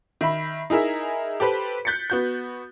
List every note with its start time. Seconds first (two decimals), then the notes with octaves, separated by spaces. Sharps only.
0.21 D#3 E5 B5
0.70 D#4 E4 G#4 A#4 E5
1.40 G4 A4 B4 C5
1.85 F#6 G6 A6 B6 C#7
2.10 B3 F#4 G6